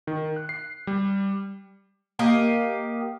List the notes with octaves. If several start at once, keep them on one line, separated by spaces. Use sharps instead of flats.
D#3
F#6
C7
G3
A#3 G4 D#5